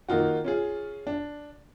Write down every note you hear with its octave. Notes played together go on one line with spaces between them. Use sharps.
D#3 A#3 D#4 F4 F#4
C#4 F4 G#4
D4